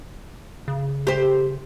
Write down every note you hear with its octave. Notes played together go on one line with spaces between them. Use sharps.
C#3
G4 C5